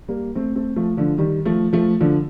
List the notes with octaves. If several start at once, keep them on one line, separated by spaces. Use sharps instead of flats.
G3 A#3
A3 C4
A3 C4
F3 A3
D3 F3
D#3 G3
F3 A3
F3 A3
D3 F3